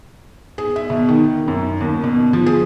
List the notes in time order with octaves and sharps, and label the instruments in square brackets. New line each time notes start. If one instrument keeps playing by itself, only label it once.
[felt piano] G#4
E5
B2
D#3
F#2
D#2
B2
F3
G#4